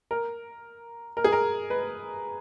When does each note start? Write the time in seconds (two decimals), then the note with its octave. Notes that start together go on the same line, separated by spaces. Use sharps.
0.11 A#4
1.17 A#4
1.24 G#4
1.32 A#4
1.70 B4